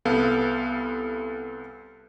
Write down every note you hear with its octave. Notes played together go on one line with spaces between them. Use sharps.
C2 B3 A4 F5